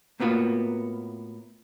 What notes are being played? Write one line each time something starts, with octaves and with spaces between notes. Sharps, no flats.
A2 A#3 B3 F4 F#4